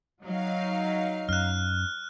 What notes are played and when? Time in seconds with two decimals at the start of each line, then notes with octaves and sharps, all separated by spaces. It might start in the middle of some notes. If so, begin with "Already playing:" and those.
0.25 F#3 D#4 F5
1.29 F#2 F6 F#6